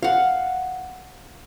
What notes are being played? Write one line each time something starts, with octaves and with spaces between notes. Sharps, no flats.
F5 F#5